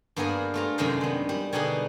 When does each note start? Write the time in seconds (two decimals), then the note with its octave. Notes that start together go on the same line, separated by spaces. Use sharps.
0.16 G2 A#3 B3 D4 G#4 A#4
0.54 A3 F4 A#5
0.78 F#2 C3 D#3 G#3 D4 C5
1.01 D#3 B3
1.29 G3
1.53 B2 D3 G3 D4 D#4 G#4